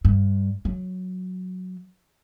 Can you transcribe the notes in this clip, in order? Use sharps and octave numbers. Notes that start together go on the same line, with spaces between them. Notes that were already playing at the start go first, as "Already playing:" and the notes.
G2
F#3